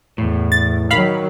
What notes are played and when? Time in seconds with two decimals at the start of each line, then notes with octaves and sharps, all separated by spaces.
0.18 E2 A2
0.52 A6
0.91 D#3 F#3 F5 B5